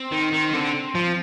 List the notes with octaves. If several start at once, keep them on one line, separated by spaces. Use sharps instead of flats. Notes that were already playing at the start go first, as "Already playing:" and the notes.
Already playing: C4
D#3
D#3
D3 C4
F3